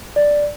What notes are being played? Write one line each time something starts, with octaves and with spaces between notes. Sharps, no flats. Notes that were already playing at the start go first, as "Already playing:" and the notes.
D5